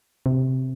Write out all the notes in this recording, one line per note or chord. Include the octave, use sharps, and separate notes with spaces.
C3